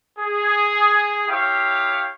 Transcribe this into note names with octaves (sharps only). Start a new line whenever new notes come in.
G#4
E4 G4 C#5 F5